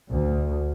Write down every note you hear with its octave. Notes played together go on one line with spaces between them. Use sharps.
D2